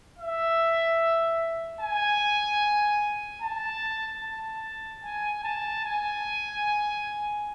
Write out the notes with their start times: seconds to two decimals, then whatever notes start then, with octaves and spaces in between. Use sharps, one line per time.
0.19 E5
1.81 G#5
3.42 A5
4.23 A5
5.04 G#5
5.44 A5
5.84 G#5